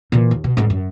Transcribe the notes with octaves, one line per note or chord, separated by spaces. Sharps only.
A#2 E3
D#2
B2
G#1 G#2
F#2